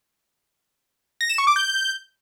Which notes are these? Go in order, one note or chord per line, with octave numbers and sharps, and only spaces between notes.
A#6
E7
C#6
D6
G6